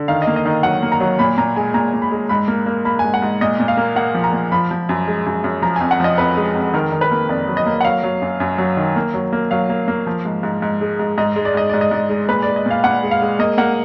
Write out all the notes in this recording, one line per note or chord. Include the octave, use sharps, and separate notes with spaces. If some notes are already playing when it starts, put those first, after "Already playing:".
Already playing: D3
D#3 F5
D#5
A#3
D#5
D#3
F#3 F#5
A#3
A#5
F#3
A#2 B5
A#2 A#5
G#3 G#5
A#2 A#5
A#2
B5
G#3
G#2 B5
A#3
A#3
A#3 B5
G#5
G#2
F#5
G#2
A#2 D#5
A#2
F5
A#3
A#3 F#5
F3
A#5
A#3
F3 B5
F3
F#2
G#3
F#2
F#2
F3 A#5
F2 G#5
F#5
F3 D#5
F2 B4
G#3
F2
D#3 A#4
D#3
B4
A#3
F2 D5
F#3
D#5
A#3
F#5
F#3 F5
F#3
F#2
F#2
F#3
D#3
A#3
F#3
A#3
F#3 F5
A#3
A#3
F3
G#2
G#2
G#2
G#3
G#2
G#2 D#5
G#3
D5
G#2 D#5
G#2 D5
D#5
G#2 D5
G#3
A#2 B4
G#3 D5
D#5
A#2 F5
A#2 F#5
G#3
F5
G#3
A#3 D#5
A#3 F#5